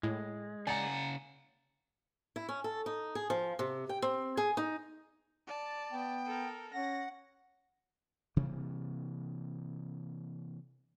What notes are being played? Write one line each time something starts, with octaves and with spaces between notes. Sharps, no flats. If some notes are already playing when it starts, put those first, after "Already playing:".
A2 G#3
C#3 D5 F#5 G#5 A#5
E4
C#4
A4
D#4
G#4
F3
C3
G5
C4
G#4
D#4
D5 A5
B3 G5
A4 A#4
C#4 F#5 A#6
C3 E3 G3 A#3